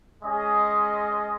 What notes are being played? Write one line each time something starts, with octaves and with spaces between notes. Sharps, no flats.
G#3 C#4 G#4 D#5